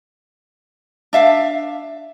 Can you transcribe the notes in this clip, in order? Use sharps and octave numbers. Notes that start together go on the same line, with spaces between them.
D4 E5 F5